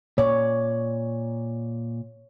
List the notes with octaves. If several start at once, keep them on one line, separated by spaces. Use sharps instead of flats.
A#2 C#5 D5